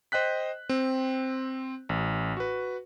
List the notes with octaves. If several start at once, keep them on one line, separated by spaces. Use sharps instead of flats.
C5 D#5 G5 F#6 B6
C4
A1
F#4 B4